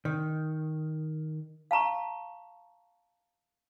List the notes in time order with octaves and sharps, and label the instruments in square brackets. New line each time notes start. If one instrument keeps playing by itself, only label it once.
[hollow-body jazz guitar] D#3
[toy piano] F5 A5 A#5 C#6